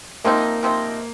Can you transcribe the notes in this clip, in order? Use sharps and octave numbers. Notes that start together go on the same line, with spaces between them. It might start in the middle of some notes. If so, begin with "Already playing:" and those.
C3 F3 A#3 C4 D#4
C3 F3 C4 D#4